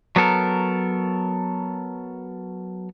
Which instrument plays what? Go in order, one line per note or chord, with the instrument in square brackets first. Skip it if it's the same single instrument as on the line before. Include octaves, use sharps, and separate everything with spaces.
[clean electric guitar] F#3 B3 A4 A#4